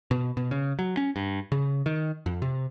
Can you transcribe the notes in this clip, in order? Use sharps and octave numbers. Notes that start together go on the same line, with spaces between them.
B2
B2
C#3
F#3
C#4
G2
C#3
D#3
F2
C3